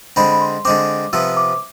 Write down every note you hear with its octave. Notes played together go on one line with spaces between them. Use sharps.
D3 G#3 C4 B5
B5
C6
D3 G#3 C4 D6
C3 F3 B3 E6
D6